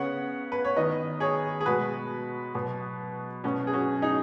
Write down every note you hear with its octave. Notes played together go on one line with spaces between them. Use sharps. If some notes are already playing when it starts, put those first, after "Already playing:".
Already playing: C#3 B3 C#5 F#5
B4
C#5
D#3 B3 B4 D#5
G#4 C#5
G#4
B2 G#3 B3 F#4 B4
B2 F#3 B3
B2 F#3 B3 C#4 F#4
G#4
C#4 F#4
D#4 G#4